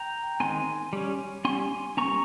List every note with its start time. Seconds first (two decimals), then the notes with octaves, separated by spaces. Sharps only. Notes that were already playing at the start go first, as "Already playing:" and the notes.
Already playing: G5 A#5
0.40 D#3 G#3 C4 G#5 C6
0.93 G3 C#4
1.45 G3 C#4 G#5 C6
1.97 G3 A#3 C#4 A#5 C#6